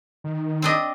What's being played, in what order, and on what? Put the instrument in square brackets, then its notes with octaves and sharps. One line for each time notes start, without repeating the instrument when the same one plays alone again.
[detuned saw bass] D#3
[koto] C4 D4 D#5